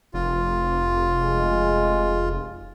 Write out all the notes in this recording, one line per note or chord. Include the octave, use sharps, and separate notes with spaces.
F1 F4
G#3